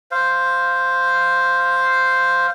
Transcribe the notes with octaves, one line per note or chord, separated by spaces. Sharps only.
C5 F5